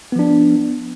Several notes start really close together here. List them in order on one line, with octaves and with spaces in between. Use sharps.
B3 F3 D4